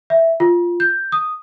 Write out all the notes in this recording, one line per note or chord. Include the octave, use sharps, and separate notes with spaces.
E5
F4
G6
D#6